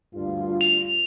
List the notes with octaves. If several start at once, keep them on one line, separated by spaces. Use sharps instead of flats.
D2 G2 F4
F7